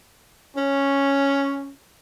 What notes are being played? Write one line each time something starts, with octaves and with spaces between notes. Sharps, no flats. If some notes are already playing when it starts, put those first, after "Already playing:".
C#4